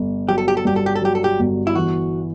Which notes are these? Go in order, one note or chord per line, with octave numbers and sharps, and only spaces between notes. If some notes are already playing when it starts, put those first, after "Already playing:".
Already playing: G1
F#3 G4
A4
G4
A4
G2 G4
A4
G4
A4
F#3 G4
A4
G4
G1
E4
E3 F#4